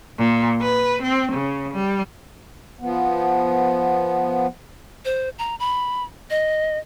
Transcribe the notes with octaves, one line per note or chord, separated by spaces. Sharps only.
A#2
B4
C4
C#3
G3
F3 B3
C5
A#5
B5
D#5